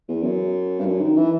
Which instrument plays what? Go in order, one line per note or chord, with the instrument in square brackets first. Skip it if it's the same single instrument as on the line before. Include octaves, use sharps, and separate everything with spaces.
[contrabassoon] E2
F#2
G2
F#2
D#3
E3